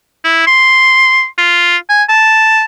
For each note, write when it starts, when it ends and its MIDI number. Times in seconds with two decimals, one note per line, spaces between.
0.24 0.44 64
0.47 1.26 84
1.38 1.77 65
1.89 2.03 80
2.09 2.65 81